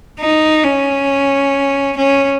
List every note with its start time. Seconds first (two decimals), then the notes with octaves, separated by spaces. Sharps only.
0.20 D#4
0.64 C#4
1.97 C#4